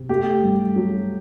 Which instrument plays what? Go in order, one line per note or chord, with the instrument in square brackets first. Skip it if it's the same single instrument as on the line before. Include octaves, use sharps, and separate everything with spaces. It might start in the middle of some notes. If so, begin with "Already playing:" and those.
Already playing: [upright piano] C3
A3 G4
G2
F#3